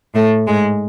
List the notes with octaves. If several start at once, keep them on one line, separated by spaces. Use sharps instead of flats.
A2 A3
G#2 G#3